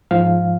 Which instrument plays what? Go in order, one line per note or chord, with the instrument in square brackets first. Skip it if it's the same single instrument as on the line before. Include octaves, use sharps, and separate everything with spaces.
[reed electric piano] G#2 F3 F5